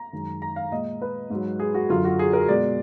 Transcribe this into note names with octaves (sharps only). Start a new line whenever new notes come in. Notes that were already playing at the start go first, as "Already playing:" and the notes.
Already playing: A#5
F#2 D#3 G#3
A#5
F5
A#2 G#3 D#5
B4
G#2 F#3
G#4
F#4
F#2 D3 F#3 F4
F#4
G#4
A#4
B2 G#3 D5